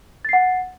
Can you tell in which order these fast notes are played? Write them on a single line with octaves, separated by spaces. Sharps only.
A6 C7 F#5